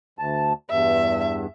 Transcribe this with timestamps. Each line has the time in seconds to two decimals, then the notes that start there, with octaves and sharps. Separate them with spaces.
0.19 D2 A5
0.70 E2 G2 E5